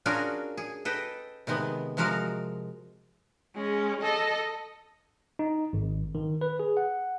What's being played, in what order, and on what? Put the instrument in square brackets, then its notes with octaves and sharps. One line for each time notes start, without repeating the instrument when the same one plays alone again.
[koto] C#4 D4 F4 F#4 G#4 A#4
G#4
A4 B4 D#5 G5
C3 D#3 G#3 B3
C3 F3 G#3 F#4 A#4 F5
[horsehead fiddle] G#3 C#4
A4 D#5
[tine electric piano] D#4
G#1
D#3
B4
G#4
F#5